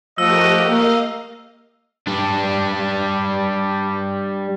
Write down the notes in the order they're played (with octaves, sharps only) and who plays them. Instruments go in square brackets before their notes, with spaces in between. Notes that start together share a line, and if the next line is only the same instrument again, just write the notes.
[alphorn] F3 [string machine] A3 G4 A#4 [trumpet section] F#4 D#5 [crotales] E6
[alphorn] A#3 [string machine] D#5 F5
[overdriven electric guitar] G3 D4